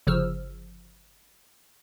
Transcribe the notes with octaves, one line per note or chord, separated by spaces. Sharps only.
G1 C#3 F3 E6 F6